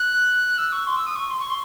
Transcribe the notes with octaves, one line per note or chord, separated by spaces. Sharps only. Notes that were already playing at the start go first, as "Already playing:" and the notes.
Already playing: F#6
E6
C#6
C6
E6
D#6
C#6
C6
C#6
C6